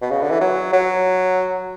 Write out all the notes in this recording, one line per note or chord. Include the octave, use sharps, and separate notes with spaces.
B2
C#3
D3
E3
F#3
F#3